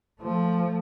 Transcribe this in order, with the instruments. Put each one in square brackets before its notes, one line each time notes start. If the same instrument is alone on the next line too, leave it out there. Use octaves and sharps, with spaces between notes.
[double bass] F3 A3